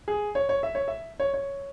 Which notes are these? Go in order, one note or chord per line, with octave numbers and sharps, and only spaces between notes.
G#4
C#5
C#5
E5
C#5
E5
C#5
C#5